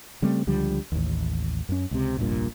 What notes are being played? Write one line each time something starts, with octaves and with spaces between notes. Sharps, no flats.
C#3 G3 A3 C4
C#2 D3 F3 G3
A1 D#2
F#2 C#4
C#2 C3
F1 A#1 G2 A#2